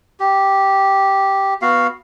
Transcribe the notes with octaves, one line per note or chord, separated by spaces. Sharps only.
G4
B3 F#4 F5